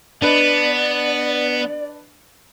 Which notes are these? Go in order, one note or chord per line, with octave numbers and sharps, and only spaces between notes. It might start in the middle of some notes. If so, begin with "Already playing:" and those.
B3 D4 B4 D5 D#5